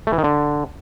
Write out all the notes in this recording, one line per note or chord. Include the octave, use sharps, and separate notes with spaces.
A3
E3
D#3
D3